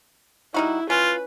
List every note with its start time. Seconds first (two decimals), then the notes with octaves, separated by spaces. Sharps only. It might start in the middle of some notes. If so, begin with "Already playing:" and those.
0.54 G3 D#4 E4 F#4
0.90 C#4 F4 B4